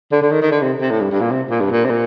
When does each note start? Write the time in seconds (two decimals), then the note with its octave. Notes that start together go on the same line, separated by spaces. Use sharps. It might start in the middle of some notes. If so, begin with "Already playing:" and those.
0.12 D3
0.22 D3
0.32 D#3
0.42 D#3
0.52 D3
0.62 C3
0.81 C3
0.91 A2
1.01 G2
1.11 G2
1.21 A#2
1.31 C3
1.51 A#2
1.60 G2
1.71 A#2
1.85 C3
1.90 A#2